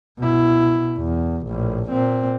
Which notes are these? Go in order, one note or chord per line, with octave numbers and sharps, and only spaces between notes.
B2 E4
E2
A#1 A2
A#2 C4